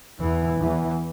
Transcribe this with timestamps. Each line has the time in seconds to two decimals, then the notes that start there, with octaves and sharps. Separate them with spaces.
0.21 E2 E3
0.61 E2 E3